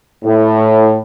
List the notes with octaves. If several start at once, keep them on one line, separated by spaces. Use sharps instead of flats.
A2